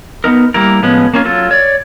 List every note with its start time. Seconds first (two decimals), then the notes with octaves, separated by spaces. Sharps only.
0.24 B3 C#4 D#4 A#4
0.54 G3 A#3 E4 A#4
0.82 A2 F3 G#3 B3 C#4
1.14 A#3 C#4 F4
1.25 F#3 F4 A4
1.51 C#5 D5